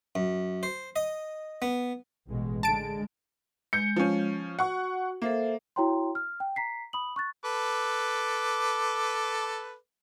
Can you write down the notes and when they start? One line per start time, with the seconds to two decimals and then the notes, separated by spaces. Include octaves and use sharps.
0.15 F#2
0.63 C5
0.96 D#5
1.62 B3
2.28 A1 B2 G#3
2.63 D3 G#3 A5 D7
3.73 G#3 G6 C#7
3.96 F3 C#4
4.59 F#4 F#5 C#6
5.22 A#3 A4 C5 E5
5.76 E4 F#4 C#5 G5 A#5 C6
6.15 F6
6.40 G5
6.56 A#5 B6 C7
6.93 B5 D#6 F#7
7.16 C#6 F#6 A6
7.44 A4 B4 D6